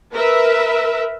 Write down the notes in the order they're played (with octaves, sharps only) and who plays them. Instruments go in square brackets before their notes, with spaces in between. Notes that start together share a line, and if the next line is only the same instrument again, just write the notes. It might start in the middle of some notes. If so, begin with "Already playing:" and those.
[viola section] A#4 B4 E5